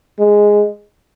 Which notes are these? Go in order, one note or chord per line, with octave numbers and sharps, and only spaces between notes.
G#3